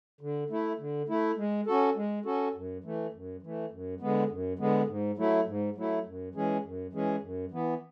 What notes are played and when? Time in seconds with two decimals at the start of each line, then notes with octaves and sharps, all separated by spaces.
0.21 D3
0.50 A3 E4
0.79 D3
1.08 A3 E4
1.38 G#3
1.67 C#4 F#4 A4
1.96 G#3
2.25 C#4 F#4 A4
2.54 F#2
2.84 E3 A3
3.13 F#2
3.42 E3 A3
3.71 F#2
4.00 D3 G#3 B3
4.30 F#2
4.59 D3 G#3 B3
4.88 G#2
5.17 F#3 A3 E4
5.46 G#2
5.76 F#3 A3 E4
6.06 F#2
6.34 E3 G#3 C#4 G#4
6.64 F#2
6.93 E3 G#3 C#4 G#4
7.22 F#2
7.51 E3 B3